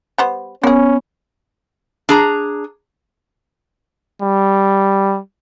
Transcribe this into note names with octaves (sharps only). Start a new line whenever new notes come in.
G3 B3 C5
A#3 B3 C#4 G#4
D4 G#4 A#5
G3